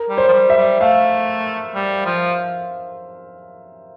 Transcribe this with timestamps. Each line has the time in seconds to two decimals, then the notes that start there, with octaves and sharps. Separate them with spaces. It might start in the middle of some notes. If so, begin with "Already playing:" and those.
Already playing: A#4
0.10 G3
0.18 C5
0.28 F3
0.33 G3
0.50 E5
0.57 G3
0.80 A3 F5
1.75 G3
2.05 F3